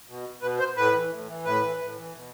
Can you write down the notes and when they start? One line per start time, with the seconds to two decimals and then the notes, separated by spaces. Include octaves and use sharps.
0.08 B2
0.42 B2 B4
0.59 C5
0.77 A2 B4
0.94 E3
1.11 A2
1.28 E3
1.45 A2 B4
1.63 E3
1.80 A2
1.96 E3
2.14 B2